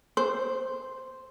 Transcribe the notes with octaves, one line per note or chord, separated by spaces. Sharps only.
C5